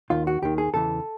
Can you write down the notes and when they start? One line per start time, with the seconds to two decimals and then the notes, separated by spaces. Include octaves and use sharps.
0.10 D#2 D#3 F4
0.27 F#4
0.42 D#2 D#3 G4
0.58 G#4
0.73 E2 C#3 E3 A4